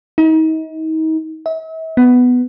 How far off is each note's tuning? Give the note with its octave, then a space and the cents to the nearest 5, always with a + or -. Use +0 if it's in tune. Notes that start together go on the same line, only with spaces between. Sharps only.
D#4 +35
E5 -40
B3 +5